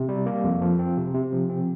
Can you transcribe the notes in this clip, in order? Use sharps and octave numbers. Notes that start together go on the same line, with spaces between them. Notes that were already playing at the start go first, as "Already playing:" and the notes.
Already playing: C3
G3
A#3
F2
F3
C4
C3
C3
F3
C4